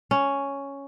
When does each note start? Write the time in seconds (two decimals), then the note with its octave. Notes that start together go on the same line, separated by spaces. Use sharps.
0.11 C#4